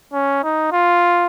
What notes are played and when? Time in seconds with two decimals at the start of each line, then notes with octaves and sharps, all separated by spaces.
0.13 C#4
0.43 D#4
0.72 F4